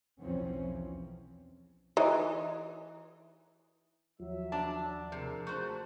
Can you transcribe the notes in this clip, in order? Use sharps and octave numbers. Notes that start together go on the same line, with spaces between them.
B1 E2 E3 F3 C4 C#4
E3 D#4
D#2 F3 F#3 E5
D4 A5
C3 G#4 A#4
A3 F#4 C5